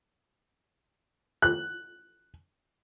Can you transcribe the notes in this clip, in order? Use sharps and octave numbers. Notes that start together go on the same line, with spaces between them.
F#6